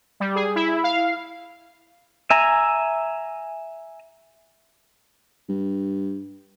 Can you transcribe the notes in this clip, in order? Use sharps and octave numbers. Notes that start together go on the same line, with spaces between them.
G3
G#4
E4
F5
E5 G#5 A#5
G2